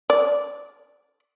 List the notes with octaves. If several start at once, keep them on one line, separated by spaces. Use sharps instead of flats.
D5